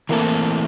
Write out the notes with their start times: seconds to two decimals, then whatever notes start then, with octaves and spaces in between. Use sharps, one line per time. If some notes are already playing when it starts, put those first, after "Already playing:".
0.09 E3 A3 A#3 C4 E4 A4